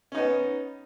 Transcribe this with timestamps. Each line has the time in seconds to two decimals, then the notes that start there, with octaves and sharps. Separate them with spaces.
0.12 C#4
0.15 D#4
0.17 B3